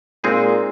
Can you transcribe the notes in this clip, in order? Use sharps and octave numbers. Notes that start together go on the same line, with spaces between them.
A#2 G#3 C4 D#4 G#4